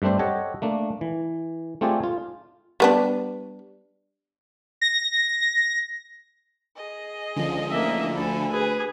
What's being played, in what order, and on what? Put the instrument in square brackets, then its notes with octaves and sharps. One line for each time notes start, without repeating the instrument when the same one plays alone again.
[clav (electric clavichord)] G2 A3 C4 D4 C5
G4 A4 C#5 D#5 F#5
A3 A#3 D4
E3
A3 C4 F4 G4 G#4 D5
F4
[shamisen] G3 B3 D4
[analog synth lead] A#6
[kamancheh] G#4 D#5
[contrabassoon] C#2 [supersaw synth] D3 F3
[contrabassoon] A1 [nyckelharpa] A#3 E5
[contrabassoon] D2 [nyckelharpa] A4 [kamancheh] G#5 B5
[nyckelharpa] G#4 B4